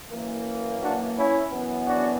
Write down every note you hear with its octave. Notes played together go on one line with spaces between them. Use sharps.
F#2 E3 A#3
D4 F#4
C#4 E4
F#2 E3 B3
D4 F#4